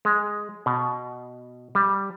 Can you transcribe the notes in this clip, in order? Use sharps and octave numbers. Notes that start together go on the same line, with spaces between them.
G#3
B2
G3